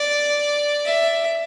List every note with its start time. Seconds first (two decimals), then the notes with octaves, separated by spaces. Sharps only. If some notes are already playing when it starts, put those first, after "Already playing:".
Already playing: D5
0.85 E5